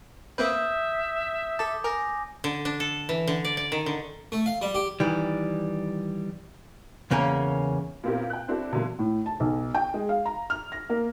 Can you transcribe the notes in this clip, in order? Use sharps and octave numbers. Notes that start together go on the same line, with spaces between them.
A#3 C4 B4 E5 D#6 G6
A4 A5 D6
A#4 G#5 D6 A#6
D3
D4
A4
E3
D3
D5
D5
D#3
D3
A3
F5
G3
G4
D#3 E3 G3
E2 C#3 A#3 C#4 A#4
A#2 B3 C4 E4 G4 A#4
G5 F#6
C4 D4 E4 F#4 A4
B2 D3 E3 F#3 G3 A#3
A2
A5
B1
G5
G#3
F5
A#5
F6
A#6
A#3